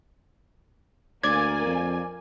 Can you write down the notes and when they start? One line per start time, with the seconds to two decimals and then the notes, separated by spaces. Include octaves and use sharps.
1.23 D2 A#3 D5 G#5 G#6
1.66 F2